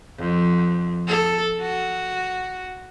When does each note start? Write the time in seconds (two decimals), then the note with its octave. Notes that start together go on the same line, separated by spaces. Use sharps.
0.18 F2
1.07 A4
1.61 F#4